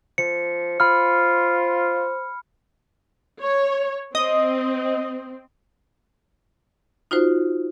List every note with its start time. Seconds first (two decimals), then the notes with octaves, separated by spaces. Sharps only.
0.18 F3 C#7
0.80 F4 C5 B5 F6
3.40 C#5
4.15 C4 D#5
7.11 D#4 F4 F#4 C5